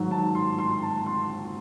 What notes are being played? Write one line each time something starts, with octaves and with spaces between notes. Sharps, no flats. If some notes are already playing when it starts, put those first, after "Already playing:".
Already playing: G#2 D#3 F#3
A5
C6
C6
A5
C6